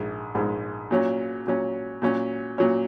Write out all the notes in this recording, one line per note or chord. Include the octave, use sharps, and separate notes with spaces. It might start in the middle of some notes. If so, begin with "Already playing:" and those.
Already playing: A#1 G#2 G#3
A#1 G#2 G#3
A#2 F#3 C#4
A#2 F#3 C#4
A#2 F#3 C#4
A#2 F#3 C#4